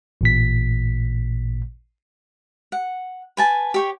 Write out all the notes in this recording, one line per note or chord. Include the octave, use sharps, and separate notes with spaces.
A1 A#2 B6
F#5
B4 G#5 A5
G4 C#5 G5